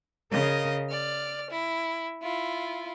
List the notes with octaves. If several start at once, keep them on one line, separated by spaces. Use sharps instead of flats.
C#3 A#4 D#5 F5
D5 F6
E4
E4 F4